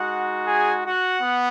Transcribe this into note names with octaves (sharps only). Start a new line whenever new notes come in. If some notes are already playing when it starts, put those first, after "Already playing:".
Already playing: G#3 D#4 F#4 F#5
G#4 G#5
F#4 F#5
B3